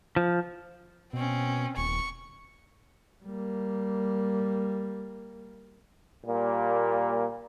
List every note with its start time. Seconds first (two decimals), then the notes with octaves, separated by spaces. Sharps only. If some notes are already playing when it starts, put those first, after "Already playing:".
0.16 F3
1.13 B2 C4 C#4
1.77 D#1 C#6
3.24 G3 A#3
6.26 A#2 G3 A#3